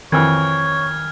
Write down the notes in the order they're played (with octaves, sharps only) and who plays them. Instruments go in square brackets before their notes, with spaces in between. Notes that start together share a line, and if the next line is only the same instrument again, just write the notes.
[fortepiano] F2 E3 [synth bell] D#3 [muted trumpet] C#5 [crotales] F6 G#6